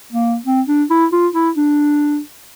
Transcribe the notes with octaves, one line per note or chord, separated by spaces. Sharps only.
A#3
C4
D4
E4
F4
E4
D4